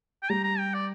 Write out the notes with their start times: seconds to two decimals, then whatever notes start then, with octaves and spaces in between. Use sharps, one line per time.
0.23 G5
0.29 G3 G4 A#5
0.44 A#5
0.59 G5
0.74 D5